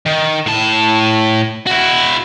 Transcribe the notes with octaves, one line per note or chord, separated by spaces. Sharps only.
D#3
A2 A5
E4 F#4